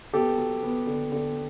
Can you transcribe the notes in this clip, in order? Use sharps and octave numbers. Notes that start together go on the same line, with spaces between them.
B3 G4 A4
F#3
B3
D3
D3